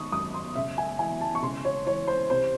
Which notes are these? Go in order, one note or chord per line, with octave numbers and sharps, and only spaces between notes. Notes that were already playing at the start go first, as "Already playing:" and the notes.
Already playing: D#3 C#6 D#6
F#2 D#6
C6
C#3 E5
G#5
E3 G#5
A5
C#6
C#3 C6
C#5
E3 C#5
C5
C3 C5